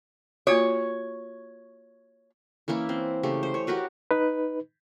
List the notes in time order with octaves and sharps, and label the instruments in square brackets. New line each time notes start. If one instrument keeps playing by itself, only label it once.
[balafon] A#3 F4 F#4 [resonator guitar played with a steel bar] C#5
[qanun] E3 A#3 C#4 E4
C4
C#3 A3 G4
C5
C#5
F#4 G4 A#4 B4
[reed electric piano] D#4 B4